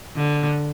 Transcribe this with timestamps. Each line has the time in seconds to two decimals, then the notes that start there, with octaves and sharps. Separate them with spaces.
0.16 D3